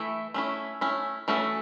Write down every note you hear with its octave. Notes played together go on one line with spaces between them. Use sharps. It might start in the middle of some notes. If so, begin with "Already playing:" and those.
Already playing: E3 A3 E4
A3 C#4 E4
A3 C#4 E4
E3 A3 C#4 F#4 A4